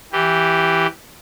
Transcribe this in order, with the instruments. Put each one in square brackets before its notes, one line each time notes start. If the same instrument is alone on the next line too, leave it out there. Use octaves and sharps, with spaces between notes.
[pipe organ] E3 G4